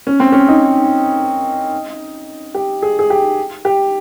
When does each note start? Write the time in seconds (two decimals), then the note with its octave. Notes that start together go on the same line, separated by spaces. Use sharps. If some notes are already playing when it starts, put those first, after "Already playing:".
0.07 C#4
0.20 C4
0.32 C#4
0.48 D#4
2.54 G4
2.82 G#4
2.99 G#4
3.10 G4
3.65 G4